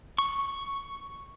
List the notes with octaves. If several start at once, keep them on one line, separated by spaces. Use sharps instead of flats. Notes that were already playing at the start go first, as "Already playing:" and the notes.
C#6